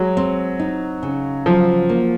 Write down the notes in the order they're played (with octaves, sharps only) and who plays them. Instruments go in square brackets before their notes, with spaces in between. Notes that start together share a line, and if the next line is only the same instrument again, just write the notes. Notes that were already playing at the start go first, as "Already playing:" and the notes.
Already playing: [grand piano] F#3 [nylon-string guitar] G#3
[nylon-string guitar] C4
D#4
C#3
[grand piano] F3 [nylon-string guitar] F#3
[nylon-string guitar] A#3